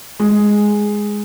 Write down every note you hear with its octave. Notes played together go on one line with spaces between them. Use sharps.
G#3